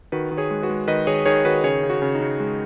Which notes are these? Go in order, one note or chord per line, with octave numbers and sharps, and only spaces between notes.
D#3 F#4 B4
D#3
G#4 C#5
G#3
F#4 B4
G#3
D#3 B4 D#5
D#3 G#4 C#5
D#3 G#4 C#5
D#3 F#4 B4
C#3 G#4 C#5
C#3
F#4
C#3
D#4
C#3
G#3